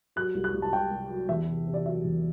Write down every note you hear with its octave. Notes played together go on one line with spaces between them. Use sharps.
F#3 F#6
C2
F#6
C2
A5
C2 G5
C2
F#3
E2 E5
C3
C3
D5
F#3 E5
E2